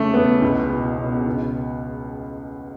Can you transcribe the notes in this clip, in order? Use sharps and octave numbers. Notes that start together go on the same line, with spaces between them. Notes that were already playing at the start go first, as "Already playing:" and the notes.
Already playing: E2 C#3 A3
E2 B3
C#2
B2
B2
C#2